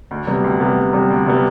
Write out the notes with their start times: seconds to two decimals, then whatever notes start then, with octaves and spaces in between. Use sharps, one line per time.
0.11 D2
0.27 C3 G3 B3
0.44 D2
0.60 C3 G3 B3
0.77 D2
0.93 C3 G3 B3
1.10 D2
1.26 C3 G3 B3